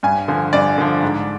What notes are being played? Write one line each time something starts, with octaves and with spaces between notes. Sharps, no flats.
G2 G#5
D3 F3
G2 D5
D3 F3
G#2